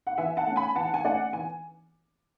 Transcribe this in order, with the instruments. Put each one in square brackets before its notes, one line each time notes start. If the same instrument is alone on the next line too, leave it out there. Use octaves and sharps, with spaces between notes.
[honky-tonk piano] F#5
E3 E5 G#5
F#5 A5
A3 C#4
G#5 B5
E3 F#5 A5
G#5
A3 C#4 D5 F#5
E3 G#5